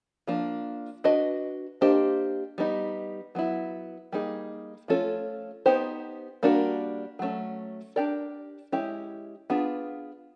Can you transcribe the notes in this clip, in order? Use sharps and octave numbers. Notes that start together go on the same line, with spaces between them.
F3 A#3 D4
D4 F#4 B4 D#5
A#3 D4 G4 C5 D#5
G3 B3 D#4
F#3 B3 E4
G3 A#3 D#4 G#4
F3 A3 C#4 F4 A4
B3 D#4 G4 C5
G3 A#3 D4 F#4 A#4
F#3 A3 C#4
D4 G4 A#4 D5
G#3 C#4 E4 G4
B3 D4 F4 G#4 B4